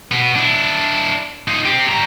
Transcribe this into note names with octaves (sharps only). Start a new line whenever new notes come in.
B2 B3
D4 E4
D#4 F4
C4 G4
G3 A#5